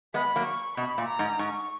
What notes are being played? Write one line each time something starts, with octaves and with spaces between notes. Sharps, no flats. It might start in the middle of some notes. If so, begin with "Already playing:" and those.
G#3 B3 B5
F#3 A#3
C#6
B2 B5
A#2
A#5
G#2
G#2 C#6